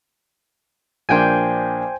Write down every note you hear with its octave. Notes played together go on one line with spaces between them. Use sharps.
A#1 A#3 D4 C5 G5 G#5